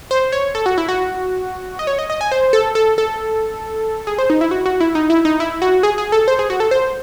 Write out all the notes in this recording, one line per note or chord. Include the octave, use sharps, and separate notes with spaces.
C5
C#5
A4
F#4
E4
F#4
D#5
C#5
D#5
D#5
G#5
C5
A4
A4
A4
G#4
C5
D#4
E4
F#4
F#4
E4
D#4
E4
D#4
E4
F#4
G#4
G#4
A4
C5
G#4
F#4
A4
C5